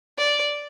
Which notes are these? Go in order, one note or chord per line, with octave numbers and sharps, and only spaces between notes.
D5